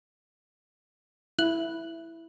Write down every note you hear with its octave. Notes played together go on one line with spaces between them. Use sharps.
E4 F#6 F#7